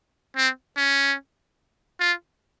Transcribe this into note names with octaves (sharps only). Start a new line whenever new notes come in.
C4
C#4
F4